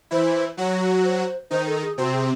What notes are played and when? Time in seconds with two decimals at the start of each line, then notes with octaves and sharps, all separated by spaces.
0.11 E3 E4 C5
0.57 F#3 F#4 C#5
1.04 C5
1.51 D#3 D#4 C5
1.67 A4
1.82 G#4
1.98 C3 C4 F#4
2.13 G#4